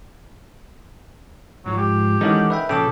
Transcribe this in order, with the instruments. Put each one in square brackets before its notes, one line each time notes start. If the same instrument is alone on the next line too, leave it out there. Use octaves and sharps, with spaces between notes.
[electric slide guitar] G#2 F3 G#3 [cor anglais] F#3
[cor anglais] G4
[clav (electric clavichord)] D#3 C#4 D#4 [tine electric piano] E3 G#3 [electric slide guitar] A4 F#5
[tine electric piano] B4 E5 G5
[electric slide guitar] A#2 F3 [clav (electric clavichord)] C#3 [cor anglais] A4 [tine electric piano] G5 D6